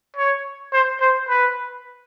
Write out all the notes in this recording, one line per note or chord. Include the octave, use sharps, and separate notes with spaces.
C#5
C5
C5
B4